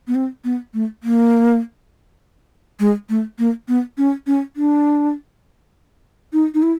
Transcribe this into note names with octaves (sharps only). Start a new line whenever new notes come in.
B3
C4
B3
A3
A#3
G#3
A3
A#3
B3
C#4
C#4
D4
D#4
D#4
E4